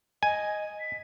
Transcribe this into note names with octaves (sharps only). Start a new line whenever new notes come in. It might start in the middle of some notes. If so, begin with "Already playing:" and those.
D#5 G#5
B6